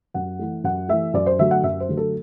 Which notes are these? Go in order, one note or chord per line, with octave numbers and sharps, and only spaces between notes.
F#2 F#5
E3 A3
F#2 F#5
E3 A3 E5
F#2 D5
C5
D3 F#3 A3 E5
F#5
F#2 E5
C5
D3 F#3 A3
A4